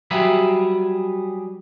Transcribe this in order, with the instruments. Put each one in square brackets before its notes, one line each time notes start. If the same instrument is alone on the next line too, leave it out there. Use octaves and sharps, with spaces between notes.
[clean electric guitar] F#3 G3 G4 G#4 B4 E5